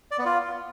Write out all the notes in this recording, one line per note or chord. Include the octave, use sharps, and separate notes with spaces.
D5
B3
F4